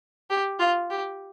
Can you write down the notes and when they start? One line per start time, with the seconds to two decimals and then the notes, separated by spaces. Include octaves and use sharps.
0.30 G4
0.59 F4
0.90 G4